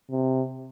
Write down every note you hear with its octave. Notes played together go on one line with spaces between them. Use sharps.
C3